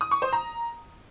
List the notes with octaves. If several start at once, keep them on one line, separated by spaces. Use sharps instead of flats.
D#6
C#6
C5
A#5